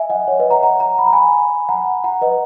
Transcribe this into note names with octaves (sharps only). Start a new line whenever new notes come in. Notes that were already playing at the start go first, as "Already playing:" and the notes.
Already playing: E5 G#5
D#5 F#5
C#5
B4 D#5
F#5 A#5
F#5 A#5
F#5 A#5
B5
A#5
G#5 B5
F#5 A#5
F#5 A#5
B4 D#5